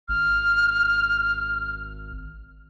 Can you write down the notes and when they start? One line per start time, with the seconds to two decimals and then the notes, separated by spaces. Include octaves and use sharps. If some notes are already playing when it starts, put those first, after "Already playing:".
0.09 G#1 F6